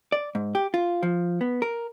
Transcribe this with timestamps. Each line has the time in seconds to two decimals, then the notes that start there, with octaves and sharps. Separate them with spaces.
0.12 D5
0.35 G#2
0.55 G4
0.74 F4
1.03 F3
1.41 B3
1.62 A#4